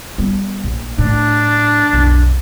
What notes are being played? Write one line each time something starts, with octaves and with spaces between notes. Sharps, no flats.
G3 B3
A#1
A2 D4
B1 F2